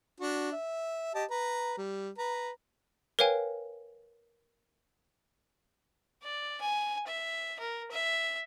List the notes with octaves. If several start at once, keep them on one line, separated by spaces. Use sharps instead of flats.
D4 F#4
E5
G4 D#5 A5
B4 A#5
G3
B4 A#5
A#4 B4 C#5 F5 G5 G#5
D5
G#5
E5
A#4
E5